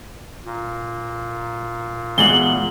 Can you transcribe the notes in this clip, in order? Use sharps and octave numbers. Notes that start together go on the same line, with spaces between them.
A#2
E2 G#2 B2 F#7 G7